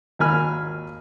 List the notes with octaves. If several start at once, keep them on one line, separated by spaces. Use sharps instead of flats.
G#1 D#2 A#3 G#5 B5 F6